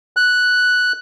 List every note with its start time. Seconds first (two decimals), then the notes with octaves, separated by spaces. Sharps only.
0.17 F#6